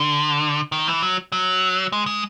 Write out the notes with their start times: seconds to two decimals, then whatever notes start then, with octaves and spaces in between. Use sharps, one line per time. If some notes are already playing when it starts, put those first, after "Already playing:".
Already playing: D3
0.72 D#3
0.88 E3
1.03 F#3
1.32 F#3
1.92 G#3
2.06 G#3